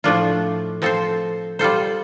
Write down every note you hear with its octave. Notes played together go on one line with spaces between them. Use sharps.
A2 F3 A3 D4 F4
F3 C4 A4 C5
G3 F4 A4 C5